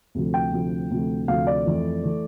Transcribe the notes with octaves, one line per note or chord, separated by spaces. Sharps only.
D2 C3 F3 A3
G5
D2 C3 F3 A3
D2 C3 F3 A3
D2 C3 F3 A3 F5
D5
F2 E3 A3
E3 A3